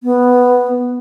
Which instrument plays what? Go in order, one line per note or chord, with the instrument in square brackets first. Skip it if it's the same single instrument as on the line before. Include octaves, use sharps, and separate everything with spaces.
[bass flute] B3